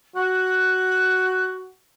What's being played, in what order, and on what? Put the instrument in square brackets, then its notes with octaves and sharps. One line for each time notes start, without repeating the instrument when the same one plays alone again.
[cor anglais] F#4 [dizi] F#6